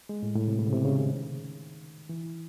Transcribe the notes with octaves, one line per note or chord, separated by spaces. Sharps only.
G#3
A2
A2
C3
A2
C#3
C3
C#3
D#3
E3